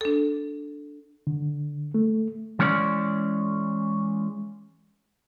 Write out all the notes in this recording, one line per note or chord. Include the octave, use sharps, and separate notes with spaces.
D4 A4
D3
A3
E3 G#3 C#4 C#5 D5